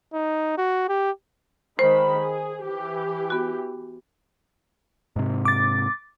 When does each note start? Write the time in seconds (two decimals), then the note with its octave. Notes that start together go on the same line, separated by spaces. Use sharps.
0.14 D#4
0.58 F#4
0.89 G4
1.79 D#3 G#3 C5 B5
2.18 G#4
2.63 E3 G4
3.30 B3 F#4
5.16 G#2 C3
5.45 D6 A6